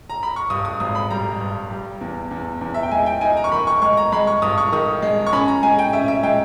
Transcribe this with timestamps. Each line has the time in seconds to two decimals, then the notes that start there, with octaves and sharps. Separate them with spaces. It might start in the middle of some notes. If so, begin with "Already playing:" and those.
0.10 A#5
0.23 B5
0.36 C#6
0.50 G2 D#6
0.65 D#6
0.80 G#1 D#6
0.95 B5
1.10 G3 A#5
1.41 G2
1.71 G3
2.01 E2
2.31 E2
2.61 E2
2.74 E5
2.83 G5
2.91 G#3 G#5
3.02 E5
3.06 G5
3.21 D#4 G#5
3.37 A#5
3.44 C#6
3.52 D#3 B5
3.67 C#6
3.82 G#3 C#6
3.97 A#5
4.12 G#3 B5
4.27 C#6
4.42 G2 D#6
4.58 C#6
4.72 D#3 D#6
5.02 G#3
5.27 C#6
5.33 C#4 B5
5.48 A#5
5.63 G#3 G#5
5.79 G5
5.93 C#4 E5
6.08 E5
6.23 G#3 G5